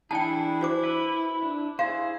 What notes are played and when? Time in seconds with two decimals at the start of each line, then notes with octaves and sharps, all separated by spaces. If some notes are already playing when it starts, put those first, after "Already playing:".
0.11 E3 D4 E4 G#4 G5 A5
0.61 F#4 C5 D6
0.83 B4 E5
1.42 D4
1.79 E4 G#4 C5 F5